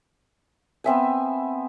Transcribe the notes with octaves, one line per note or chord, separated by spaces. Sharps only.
B3 C4 E5 G#5